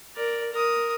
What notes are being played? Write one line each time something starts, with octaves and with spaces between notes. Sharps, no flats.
A#4 D5
A#4 D#6